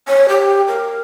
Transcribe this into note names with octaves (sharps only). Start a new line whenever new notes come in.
C#5
G4
A#4